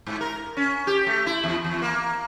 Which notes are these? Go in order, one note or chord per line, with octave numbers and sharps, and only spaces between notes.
G#2
A#4
C#4
G4
A3
E4
E2
E2
A#3